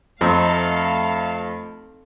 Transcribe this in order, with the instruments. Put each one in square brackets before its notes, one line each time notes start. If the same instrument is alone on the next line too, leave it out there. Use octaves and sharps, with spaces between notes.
[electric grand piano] F2 [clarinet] A3 [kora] C4 D#4 [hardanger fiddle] A4 F5